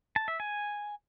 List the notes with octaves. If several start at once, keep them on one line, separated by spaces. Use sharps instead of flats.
A5
E5
G#5